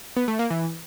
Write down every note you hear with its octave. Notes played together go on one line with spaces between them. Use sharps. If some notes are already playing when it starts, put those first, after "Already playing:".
B3
A3
A#3
E3